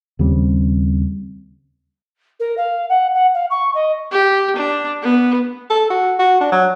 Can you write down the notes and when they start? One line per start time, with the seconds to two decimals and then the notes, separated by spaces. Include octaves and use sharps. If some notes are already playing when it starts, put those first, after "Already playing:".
0.19 D#2 C#3 G3 C4
2.40 A#4
2.57 F5
2.89 F#5
3.14 F#5
3.34 F5
3.50 C#6
3.74 D#5
4.11 G4
4.56 D4
5.02 B3
5.70 A4
5.90 F#4
6.19 F#4
6.41 D4
6.52 F#3